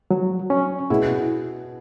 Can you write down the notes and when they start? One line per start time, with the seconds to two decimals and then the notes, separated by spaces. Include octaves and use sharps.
0.11 F#3
0.50 C#4
0.90 B2 B3 E4 G#4